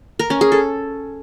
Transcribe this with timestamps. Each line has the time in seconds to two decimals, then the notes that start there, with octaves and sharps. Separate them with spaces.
0.19 A#4
0.30 C#4
0.41 G#4
0.52 A4